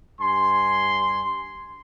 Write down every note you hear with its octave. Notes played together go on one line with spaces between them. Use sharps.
G2 G#5 C6